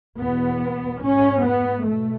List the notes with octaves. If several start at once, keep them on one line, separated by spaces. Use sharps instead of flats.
E2 B2 B3
G#2 C#4
B3
B2 A3